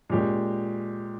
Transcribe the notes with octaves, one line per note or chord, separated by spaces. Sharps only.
A#2 G#3 C#4 G4